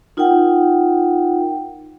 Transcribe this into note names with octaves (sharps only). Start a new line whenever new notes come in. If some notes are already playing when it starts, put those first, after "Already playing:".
D#4 F4 A#4 F#5 G5